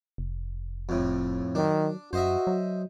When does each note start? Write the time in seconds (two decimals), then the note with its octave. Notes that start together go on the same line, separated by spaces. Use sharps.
0.18 F1
0.89 F2 A2
1.55 D#3 F#3 D4
2.13 F#2 F#4 C5 D#5 E5
2.47 F#3